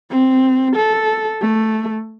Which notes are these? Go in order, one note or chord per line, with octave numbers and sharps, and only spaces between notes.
C4
A4
A3